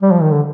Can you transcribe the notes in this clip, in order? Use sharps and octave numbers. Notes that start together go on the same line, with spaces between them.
G3
F3
D#3
D3